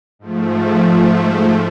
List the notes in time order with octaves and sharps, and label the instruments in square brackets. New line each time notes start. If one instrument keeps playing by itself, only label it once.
[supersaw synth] G#2 F3 A3